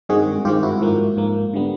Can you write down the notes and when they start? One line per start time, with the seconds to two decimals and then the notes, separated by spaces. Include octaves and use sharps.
0.09 G2 D#3 G#3 C4 F#4 G#4
0.45 G2 D#3 G#3 C4 F4 G4
0.63 E4 F#4
0.81 G#2 F3 A#3
1.17 G#2 F3 A#3
1.54 D3 G3 B3